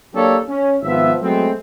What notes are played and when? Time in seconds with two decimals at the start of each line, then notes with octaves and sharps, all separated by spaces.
0.15 F#3 A#3 D4 G4 A4 C#5
0.48 C#4
0.82 G#1 F3 B3 E5
1.22 F#3 G#3 A3 B3 C4